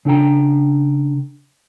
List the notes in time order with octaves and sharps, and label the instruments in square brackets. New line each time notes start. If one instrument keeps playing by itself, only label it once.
[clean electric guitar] C#3 D4 A4 G5 A#5